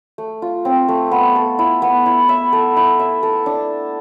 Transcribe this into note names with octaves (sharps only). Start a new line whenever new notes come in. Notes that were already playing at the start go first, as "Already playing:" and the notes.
A3
F4
C4
A3
B3
A4
E4
B3
E4
E5
A4
E4
E5
A4
D4